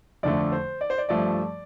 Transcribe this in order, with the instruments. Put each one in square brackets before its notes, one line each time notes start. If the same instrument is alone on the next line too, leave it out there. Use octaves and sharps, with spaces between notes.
[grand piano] F2 D3 A3 D5
C5
D5
C5
D5
G2 F3 A3 D5